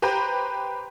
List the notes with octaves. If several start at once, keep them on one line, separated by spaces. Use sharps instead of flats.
G4 B4 C5 G5 A#5 G6